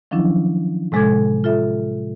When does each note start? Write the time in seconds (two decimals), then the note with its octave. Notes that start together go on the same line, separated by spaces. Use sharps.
0.11 D#3 F3 F#3 C#4 D4 E4
0.92 A2 C3 G#3 A4 D6 G#6
1.44 F4 A4 E5